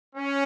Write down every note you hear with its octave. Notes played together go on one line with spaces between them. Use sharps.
C#4